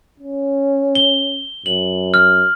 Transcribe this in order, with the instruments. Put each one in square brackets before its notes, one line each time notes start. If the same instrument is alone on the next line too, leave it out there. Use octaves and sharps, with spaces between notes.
[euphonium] C#4
[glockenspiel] G7
[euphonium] F#2 [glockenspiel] F#7
[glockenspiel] F6